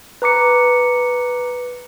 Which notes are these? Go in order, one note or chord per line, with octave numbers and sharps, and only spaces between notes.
B4 A#5 D6 C#7